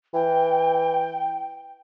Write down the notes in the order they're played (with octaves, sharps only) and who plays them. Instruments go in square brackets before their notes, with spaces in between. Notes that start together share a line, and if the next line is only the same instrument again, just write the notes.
[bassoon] E3 [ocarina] G5